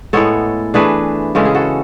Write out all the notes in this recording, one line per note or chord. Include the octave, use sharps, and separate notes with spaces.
A2 G#3 B3 A4 C#5
E3 A3 D4 G#4 B4
C#3 E3 G#3 C#4 A4
G#4
F#4 A4